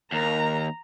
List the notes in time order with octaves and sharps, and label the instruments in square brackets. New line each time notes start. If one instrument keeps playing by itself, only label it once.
[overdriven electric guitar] D#2 [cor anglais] A#4 [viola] A#5